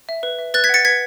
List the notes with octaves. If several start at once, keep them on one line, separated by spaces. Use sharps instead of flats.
E5
B4
E5
B4 F#6 A6
G#6 B6
F#5 A6 C#7
B4 G#6 B6